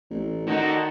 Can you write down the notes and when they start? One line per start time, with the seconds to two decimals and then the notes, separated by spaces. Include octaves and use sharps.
0.10 A1
0.47 D3 D#3 D#4 F#4